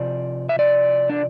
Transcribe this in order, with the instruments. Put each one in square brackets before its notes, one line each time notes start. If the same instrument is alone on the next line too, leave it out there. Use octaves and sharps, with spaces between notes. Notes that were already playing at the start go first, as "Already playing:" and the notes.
Already playing: [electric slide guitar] C3 F3 D5
E5
D5
D4